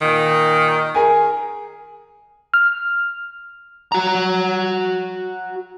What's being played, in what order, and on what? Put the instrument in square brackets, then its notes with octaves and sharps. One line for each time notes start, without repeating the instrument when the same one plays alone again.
[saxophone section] A#2 D#3
[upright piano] G#4 A#4 G#5
[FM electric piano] F6
[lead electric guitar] F#4 A#5